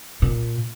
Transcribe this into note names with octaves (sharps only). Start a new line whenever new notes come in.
A#2